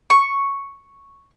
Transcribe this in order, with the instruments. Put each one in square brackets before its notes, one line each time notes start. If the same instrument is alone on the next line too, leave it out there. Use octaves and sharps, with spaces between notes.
[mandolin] C#6